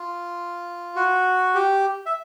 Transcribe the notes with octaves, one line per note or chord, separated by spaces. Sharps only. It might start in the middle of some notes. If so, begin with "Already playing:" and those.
Already playing: F4
F#4
G4
E5